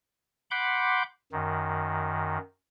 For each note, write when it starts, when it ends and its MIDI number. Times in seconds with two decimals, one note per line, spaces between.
0.51 1.03 78
0.51 1.03 83
0.51 1.03 84
0.51 1.03 86
0.51 1.03 91
1.32 2.38 42
1.32 2.38 51